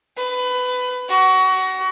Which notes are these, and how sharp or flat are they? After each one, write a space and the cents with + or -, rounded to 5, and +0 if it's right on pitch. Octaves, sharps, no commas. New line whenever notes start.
B4 +20
F#4 +25